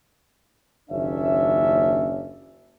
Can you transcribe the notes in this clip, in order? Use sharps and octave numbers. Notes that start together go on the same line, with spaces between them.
F#1 D#2 C#4 D4 E5